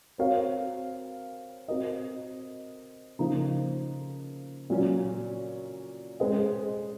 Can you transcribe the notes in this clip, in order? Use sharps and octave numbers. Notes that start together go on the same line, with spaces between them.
C4 F#4 A#4 C#5 F5
C4 F#4 A#4 D#5
C#3 F3 A#3 D#4
A#2 F#3 C#4
G#3 C#4 G#4 C5 D#5